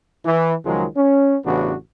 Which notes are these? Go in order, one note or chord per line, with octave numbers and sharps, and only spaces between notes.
E3
C#2 D#3 F3 F#3 G#3
C#4
A1 C#3 E3 B3 D4 F#4